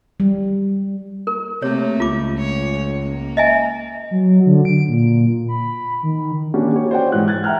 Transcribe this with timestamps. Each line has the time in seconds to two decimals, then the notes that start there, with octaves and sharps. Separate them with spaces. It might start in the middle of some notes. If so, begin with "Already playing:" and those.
0.20 G3
1.27 A#4
1.62 C3 A3 A#3 C#5
2.00 C#2 F4 D6
2.38 C#5
2.99 A#3
3.37 D#5 E5 G#5
4.11 F#3
4.46 D3
4.65 D7
4.88 A#2
5.48 B5
6.03 D#3
6.54 A#3 C#4 D4 F#4 G4
6.73 G4 C#5
6.91 C5 D5 F#5 G5
7.12 G#2 E3 F#6
7.28 F#6 G#6 A6
7.44 E5 F#5 G5 A#5 F6 F#6